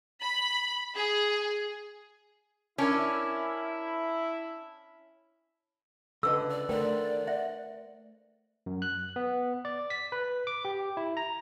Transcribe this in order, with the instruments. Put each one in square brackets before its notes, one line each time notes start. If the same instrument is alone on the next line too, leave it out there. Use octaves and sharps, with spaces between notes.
[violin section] B5
G#4
[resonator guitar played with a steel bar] C#4 [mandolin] D4 A#4 G#5 [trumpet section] E4
[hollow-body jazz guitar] C#2 D3 D#5 [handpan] A4 B4 [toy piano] E6
[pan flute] D5
[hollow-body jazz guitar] D3 D#3 [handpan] A3 A#4 C5 [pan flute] D5 [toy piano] G5
[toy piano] E5 [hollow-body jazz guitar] F#5
[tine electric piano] F#2
F#6
B3
D5
B6
B4
D6
G4
E4
A#5